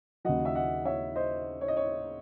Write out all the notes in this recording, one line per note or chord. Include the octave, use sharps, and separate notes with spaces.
D#2 C#3 F#3 D#5 F#5
E5
D#5 F#5
C#5 E5
C5 D#5
C#5
D#5
C#5